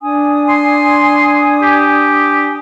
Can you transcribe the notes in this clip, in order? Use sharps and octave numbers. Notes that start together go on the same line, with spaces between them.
D4 G#5 D#6
C6
G4